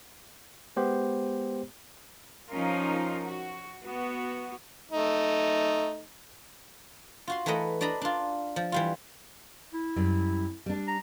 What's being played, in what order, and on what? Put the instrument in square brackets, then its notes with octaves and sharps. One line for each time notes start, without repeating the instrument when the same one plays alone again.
[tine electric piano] G#3 B3 G4 C5
[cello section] F3 C#4 D#4 F4 A#4
F#4
B3 F#4
[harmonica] A3 D#4
[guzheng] F4 F#4 C6
E3 A3 A#4 B4 D#5 F#5
D4 D5 D#5 A#5 B5
D4 F4
F3
E3 G3 F4
[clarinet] E4
[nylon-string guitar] F#2 G3
G3 D4
[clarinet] A#5